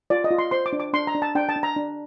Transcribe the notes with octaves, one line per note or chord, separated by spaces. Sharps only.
F4 D5
D#5
F4
C6
C5 C6
D6
D4
D6
D4 C6
A#5
D4
A5
D4 G5
A5
D4
A#5
D4